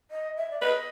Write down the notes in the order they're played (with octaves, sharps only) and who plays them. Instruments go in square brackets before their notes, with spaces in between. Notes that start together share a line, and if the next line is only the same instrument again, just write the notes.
[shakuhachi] D#5
E5
D5
[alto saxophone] B4 [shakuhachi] D#5